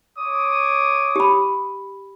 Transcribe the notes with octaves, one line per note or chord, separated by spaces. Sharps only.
C#5 D6 D#6
G4 B5